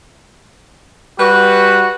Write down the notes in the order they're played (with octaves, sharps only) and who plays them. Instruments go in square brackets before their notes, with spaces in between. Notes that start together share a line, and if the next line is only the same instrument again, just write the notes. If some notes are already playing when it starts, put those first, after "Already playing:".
[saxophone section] G3 B4 [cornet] F#4